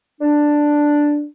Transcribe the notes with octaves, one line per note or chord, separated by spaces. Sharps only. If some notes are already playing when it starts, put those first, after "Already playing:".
D4